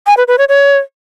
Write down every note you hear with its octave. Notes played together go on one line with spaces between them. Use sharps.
G#5
B4
B4
C#5
C#5